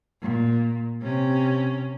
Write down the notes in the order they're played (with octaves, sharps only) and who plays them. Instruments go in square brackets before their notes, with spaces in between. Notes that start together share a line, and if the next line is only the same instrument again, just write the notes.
[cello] A#2
C3 C#4